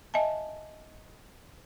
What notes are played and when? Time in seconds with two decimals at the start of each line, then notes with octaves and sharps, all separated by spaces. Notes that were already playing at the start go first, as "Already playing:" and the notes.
0.14 D#5 E5 G#5 A5